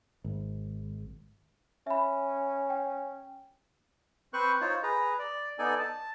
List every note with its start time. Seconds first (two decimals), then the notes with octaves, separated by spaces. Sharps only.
0.24 G#1
1.87 C#4 E5 B5
2.70 G5
4.33 C4 B4 C5 C#6 F#6
4.61 D#4 F4 C5 C#5
4.83 G#4 B4 A#5
5.19 D5
5.59 B3 D#4 A4 D5 G#5
5.79 A5